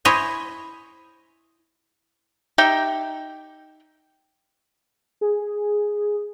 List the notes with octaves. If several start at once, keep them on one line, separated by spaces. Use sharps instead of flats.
E4 C5 C#5 D#5 G#5
D#4 G4 E5 G5
G#4